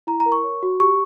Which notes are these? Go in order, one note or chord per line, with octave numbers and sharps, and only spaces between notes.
E4 A#5
A#5
A#4
C#6
C#5
F#4
G4 C#6